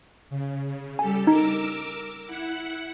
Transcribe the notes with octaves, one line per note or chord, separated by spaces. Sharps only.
C#3
G3 G4 A4 G#5
D#4 A#4 D6 E6
E4 F#5